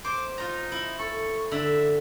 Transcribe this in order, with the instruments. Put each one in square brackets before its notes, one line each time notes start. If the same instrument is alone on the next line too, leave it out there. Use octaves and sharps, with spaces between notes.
[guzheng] C5 [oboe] D6
[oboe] D#4 [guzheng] F4 A#5
[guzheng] E4
[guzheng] A4 [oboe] C#6
[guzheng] D3 [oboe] E5